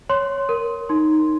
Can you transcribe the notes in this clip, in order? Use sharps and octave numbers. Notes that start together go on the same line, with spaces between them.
C#5 C6
A#4
D#4 C6